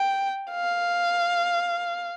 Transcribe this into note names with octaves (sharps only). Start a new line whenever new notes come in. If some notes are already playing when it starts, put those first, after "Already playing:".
Already playing: G5
F5